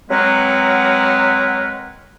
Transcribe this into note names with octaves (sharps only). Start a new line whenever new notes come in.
F#3 G#3 C4 A#4 B4 F#5